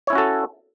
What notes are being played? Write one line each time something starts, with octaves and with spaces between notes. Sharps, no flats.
C#4 E4 F#4 A4 C#5